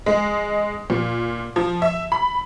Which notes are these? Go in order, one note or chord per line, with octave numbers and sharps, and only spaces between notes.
G#3
A#2
F3
E5
B5